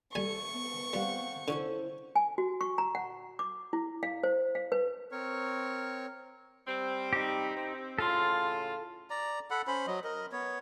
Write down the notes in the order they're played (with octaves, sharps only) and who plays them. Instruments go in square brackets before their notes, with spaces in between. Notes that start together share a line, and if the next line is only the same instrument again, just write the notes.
[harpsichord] G3 G#5 [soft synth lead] A4 [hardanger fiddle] C#6
[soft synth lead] B3
[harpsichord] G3 [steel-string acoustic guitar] C4 F5 F#5
[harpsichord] D3 [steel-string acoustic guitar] C#4 E4 C5 [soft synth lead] A4
[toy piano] G#5
F#4
C#6
A#5
F#5
D6
E4
F5
C5
F5
B4
[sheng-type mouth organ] C4 A#4 C#5 C#6
[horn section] G3 C4
[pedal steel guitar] D#4 G4
[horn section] C4
[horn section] A2 C#3 F4 [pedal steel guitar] A4 C6
[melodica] D5 A#5
A4 F#5 B5
C#4 C5 B5
F#3 D#5
A#4 D#5
B3 C#5